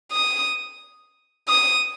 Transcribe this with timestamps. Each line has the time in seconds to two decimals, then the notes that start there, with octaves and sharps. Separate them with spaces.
0.12 D#6
1.49 D#6